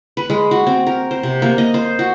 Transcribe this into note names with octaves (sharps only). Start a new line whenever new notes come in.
B4
G#3
F#4
C4
A#4
C5
C3
A#3
D#5
C5
F#4